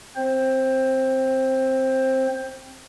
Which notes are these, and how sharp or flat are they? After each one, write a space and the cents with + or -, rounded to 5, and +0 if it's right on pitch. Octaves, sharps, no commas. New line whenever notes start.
C4 +0 C5 +15